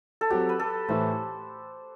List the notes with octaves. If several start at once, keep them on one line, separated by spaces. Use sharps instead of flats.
A4
F#3 C4 F#4 G4
B4
A4
A2 E3 A3 C5